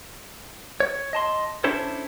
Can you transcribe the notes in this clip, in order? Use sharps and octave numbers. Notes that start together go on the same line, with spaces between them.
C#5
D#5 A5 C6
C#4 D4 E4 A4 C5 C#5